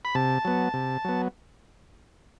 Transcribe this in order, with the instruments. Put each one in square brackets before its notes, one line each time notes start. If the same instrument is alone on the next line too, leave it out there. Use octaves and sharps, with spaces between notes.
[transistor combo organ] B5
C3 A5
F#3 B3
C3
F#3 B3